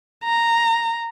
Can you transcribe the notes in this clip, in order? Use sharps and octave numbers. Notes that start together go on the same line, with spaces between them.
A#5